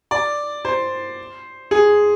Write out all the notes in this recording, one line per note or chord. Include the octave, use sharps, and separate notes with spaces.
D5
C5
G#4